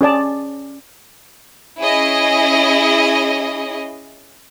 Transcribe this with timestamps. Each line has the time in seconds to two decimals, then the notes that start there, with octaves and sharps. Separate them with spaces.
0.01 C#4 G#4 D5 A5
1.80 C#4 E4 G#4 D#5